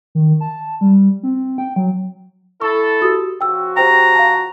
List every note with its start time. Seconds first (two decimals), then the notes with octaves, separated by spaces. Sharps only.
0.15 D#3
0.41 A5
0.81 G3
1.23 C4
1.58 G5
1.76 F#3
2.62 E4 A4 C#6
3.02 F#4 G4 D#6
3.41 C#3 F3 F#4 G5 E6
3.77 G4 C5 G5 A#5
4.15 F5 A5